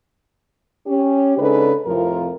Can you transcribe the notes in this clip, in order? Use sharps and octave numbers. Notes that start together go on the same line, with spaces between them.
C#4 G4
C#3 G#3 D4 D#4 A4 B4
F2 A2 C3 F3 F4 A#4